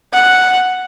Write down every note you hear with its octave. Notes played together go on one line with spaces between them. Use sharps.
F#5